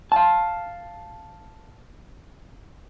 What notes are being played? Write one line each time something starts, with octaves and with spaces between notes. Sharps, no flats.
F5 A5